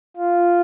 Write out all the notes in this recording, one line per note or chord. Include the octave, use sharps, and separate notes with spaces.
F4